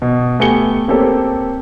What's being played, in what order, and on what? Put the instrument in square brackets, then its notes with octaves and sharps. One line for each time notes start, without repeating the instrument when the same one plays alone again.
[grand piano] B2
A3 B3 G4 G#5 C#7 G7
A#3 C4 G4 A4 C#5